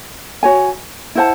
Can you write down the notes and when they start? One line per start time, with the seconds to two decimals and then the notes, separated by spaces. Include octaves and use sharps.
0.43 F#4 C#5 G#5
1.15 E4 C5 F#5 A5